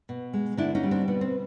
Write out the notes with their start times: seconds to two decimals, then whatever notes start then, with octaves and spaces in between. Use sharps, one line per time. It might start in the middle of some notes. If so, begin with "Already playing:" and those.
0.09 B2
0.33 G#3
0.57 D3 D4 E4
0.75 C#4 D#4
0.83 G3
0.91 C4 D4
1.08 B2 B3
1.21 C4